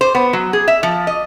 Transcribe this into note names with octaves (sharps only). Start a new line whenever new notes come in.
C5
B3
F#3
G#4
E5
F3
D#5